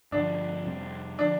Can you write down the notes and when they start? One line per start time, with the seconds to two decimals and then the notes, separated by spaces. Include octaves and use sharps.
0.12 G2 D3 F3 D4
0.66 F2 C3 G3 C4
1.19 D3 F3 D4